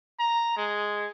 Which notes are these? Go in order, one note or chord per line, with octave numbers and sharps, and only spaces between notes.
A#5
G#3